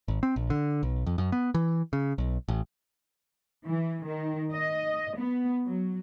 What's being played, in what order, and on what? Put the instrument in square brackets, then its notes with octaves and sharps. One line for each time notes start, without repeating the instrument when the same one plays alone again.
[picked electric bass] G#1
C4
A#1
D3
B1
F2
F#2
B3
E3
C#3
B1
A1
[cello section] E3
D#3
D#5
B3
F#3